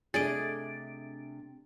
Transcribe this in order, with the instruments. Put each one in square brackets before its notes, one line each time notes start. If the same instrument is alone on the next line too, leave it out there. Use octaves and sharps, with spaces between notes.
[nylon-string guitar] C3 A3 D4 [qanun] G#4 D5 D#5 [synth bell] A6 D7